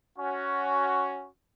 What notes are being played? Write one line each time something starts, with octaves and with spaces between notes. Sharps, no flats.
C#4 F#4